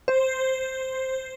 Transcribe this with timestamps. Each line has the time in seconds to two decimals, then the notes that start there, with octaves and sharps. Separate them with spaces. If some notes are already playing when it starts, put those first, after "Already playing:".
0.08 C5